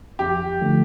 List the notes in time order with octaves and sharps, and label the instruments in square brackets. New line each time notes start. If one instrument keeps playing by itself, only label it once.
[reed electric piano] F2 [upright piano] G4
[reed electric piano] D3 F3 A3